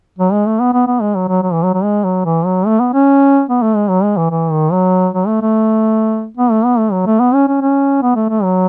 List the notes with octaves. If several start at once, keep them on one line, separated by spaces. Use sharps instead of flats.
F#3
G#3
A3
B3
B3
B3
G#3
F#3
F#3
F#3
E3
F#3
F#3
G#3
F#3
E3
F#3
A3
B3
C#4
B3
A3
G#3
F#3
G#3
E3
E3
D#3
F#3
F#3
A3
A3
B3
A3
B3
A3
F#3
A3
B3
C#4
C#4
C#4
B3
A3
A3
F#3